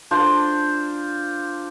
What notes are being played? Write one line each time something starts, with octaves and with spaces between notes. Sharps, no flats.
D4 F4 C5